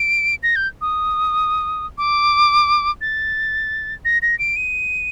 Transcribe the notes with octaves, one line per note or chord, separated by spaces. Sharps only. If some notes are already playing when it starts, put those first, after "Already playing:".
Already playing: D7
A#6
G6
D#6
D6
A6
A#6
A#6
D7
D#7